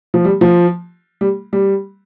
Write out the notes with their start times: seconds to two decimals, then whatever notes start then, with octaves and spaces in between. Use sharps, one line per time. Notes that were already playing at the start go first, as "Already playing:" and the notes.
0.14 F3
0.25 G3
0.41 F3
1.21 G3
1.53 G3